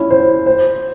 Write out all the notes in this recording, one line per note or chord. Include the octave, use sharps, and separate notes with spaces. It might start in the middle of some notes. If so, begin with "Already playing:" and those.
Already playing: C#4 E4
C5
C5